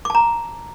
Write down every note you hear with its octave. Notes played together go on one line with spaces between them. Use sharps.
A5 A#5 D6